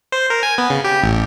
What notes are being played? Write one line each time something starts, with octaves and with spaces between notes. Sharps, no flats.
C5
A#4
G#5
B3
C#3
G4
A1